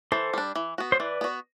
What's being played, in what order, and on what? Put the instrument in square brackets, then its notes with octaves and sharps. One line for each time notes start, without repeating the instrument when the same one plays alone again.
[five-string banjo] E3 [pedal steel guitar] A4 C5
[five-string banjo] G3 D4
E3
B3 F#4
[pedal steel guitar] C5
[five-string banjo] E3 [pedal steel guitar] B4 D5
[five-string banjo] B3 F#4